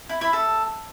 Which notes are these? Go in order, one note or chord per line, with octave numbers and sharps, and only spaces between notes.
E4
E4
A4